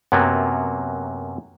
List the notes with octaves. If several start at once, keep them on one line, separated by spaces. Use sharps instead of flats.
F#2 C3 F#3 A#3 B3